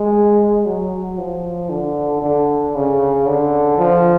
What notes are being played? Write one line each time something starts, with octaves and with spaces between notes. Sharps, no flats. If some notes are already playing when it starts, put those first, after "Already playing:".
Already playing: G#3
F#3
F3
D3
D3
C#3
D3
F3